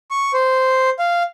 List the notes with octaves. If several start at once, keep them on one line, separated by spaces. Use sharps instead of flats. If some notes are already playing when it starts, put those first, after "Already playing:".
C#6
C5
F5